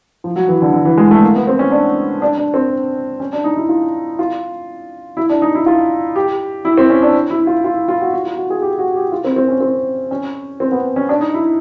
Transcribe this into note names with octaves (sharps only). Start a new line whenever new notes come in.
F3
F#3
E3
D3
D3
E3
G#3
A3
A#3
B3
C4
C#4
D4
D4
D4
C4
C#4
D4
D#4
E4
F4
F4
E4
D4
D#4
E4
F4
G4
E4
C4
C#4
D4
E4
F4
F4
F4
F#4
F#4
F4
F#4
G#4
G4
F#4
G4
F4
C4
C4
C#4
C4
C#4
C4
B3
C#4
D4
D#4
E4